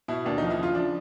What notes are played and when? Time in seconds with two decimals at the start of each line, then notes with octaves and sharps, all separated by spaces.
0.08 B2 E4
0.26 D#2 D4
0.38 F3 D#4
0.50 E4
0.58 C#3 F4
0.75 F3 D4